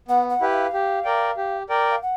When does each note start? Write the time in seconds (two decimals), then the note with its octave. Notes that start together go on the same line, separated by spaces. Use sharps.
0.08 B3 F#5
0.29 F#5
0.41 E4 G4 B4
0.51 F5
0.73 G4
1.05 A#4 D5 G5
1.37 G4
1.69 A#4 D5 G5
1.90 F5
2.02 F#5